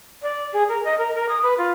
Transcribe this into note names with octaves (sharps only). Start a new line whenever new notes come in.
D5
G#4
A#4
D#5
A#4
A#4
D#6
B4
F4